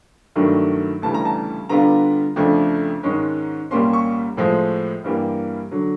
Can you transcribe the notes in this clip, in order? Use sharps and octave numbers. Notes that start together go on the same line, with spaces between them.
G2 D#3 F#3 A3 D4
D2 C#3 E3 G3 A5
A#5
A5
D3 G3 B3 D4 F4 A#5
F2 C#3 F3 A3 D4
G#2 D#3 G#3 C#4
C2 A#2 G3 A#3 C#4 C6
C#6
A2 F3 G#3 C4
G2 E3 G3 A#3
D3 F#3